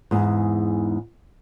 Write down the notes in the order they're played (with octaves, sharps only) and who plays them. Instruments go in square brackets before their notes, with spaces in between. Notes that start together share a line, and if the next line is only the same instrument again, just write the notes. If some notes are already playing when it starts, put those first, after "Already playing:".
[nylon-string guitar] E2 G#2